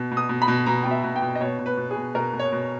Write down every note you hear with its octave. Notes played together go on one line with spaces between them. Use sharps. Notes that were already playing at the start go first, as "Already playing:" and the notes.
Already playing: B2
B2
D#6
B2
B5
B2
B2 A#5
B2 G5
E5
B2
G5
B2
D#5
B2 C#5
B2
B4
B2
G#4
B2
B2 A#4
B2
C#5
B2